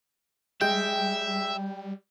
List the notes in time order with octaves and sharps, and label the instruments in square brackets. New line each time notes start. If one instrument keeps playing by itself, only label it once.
[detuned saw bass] G3 [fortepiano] G#3 [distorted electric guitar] E5 [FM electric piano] G5